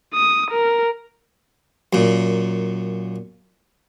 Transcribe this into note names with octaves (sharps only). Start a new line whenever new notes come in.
D#6
A#4
F#2 A#2